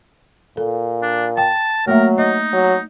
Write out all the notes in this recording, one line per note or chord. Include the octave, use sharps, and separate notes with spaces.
A#2 A4
D4
G5 A5
F#3 A3 A#3 A#4 E5
D#4 D#5
F#3